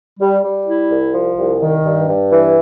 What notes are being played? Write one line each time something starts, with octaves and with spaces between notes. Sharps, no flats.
G3
G3
E4
C2
F3
C2
D#3
G2
G2
E3